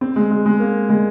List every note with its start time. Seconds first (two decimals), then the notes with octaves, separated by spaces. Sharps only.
0.01 C4
0.16 G#3
0.31 G#3
0.46 G#3
0.60 A#3
0.89 G#3